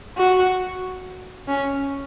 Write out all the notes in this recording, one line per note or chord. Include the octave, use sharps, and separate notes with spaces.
F#4
C#4